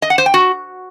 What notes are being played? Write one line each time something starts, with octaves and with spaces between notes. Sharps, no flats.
D#5
F#5
C5
G5
F#4